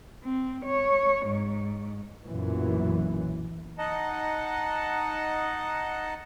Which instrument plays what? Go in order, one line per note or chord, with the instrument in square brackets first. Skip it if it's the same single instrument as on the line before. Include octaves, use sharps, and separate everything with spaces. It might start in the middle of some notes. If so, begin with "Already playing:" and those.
[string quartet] C4
C#5
G#2
[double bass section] B1 F#2 A#2 E3
[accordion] D#4 D#5 F#5 A5